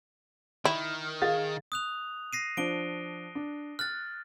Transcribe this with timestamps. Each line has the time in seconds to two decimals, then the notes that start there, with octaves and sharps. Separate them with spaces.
0.65 D#3 E4
1.22 G#4 F5 A6
1.72 D#6 F#6 F7
2.33 A#6 C7 D#7
2.57 F3 D4 D7 G7
3.35 D4
3.79 F6 F#6 A6